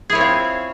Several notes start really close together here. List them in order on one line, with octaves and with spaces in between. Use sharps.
G#4 E4 C#5 C4 F4